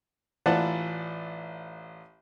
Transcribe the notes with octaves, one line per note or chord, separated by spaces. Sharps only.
A1 E3 F4 D5 F#5 A5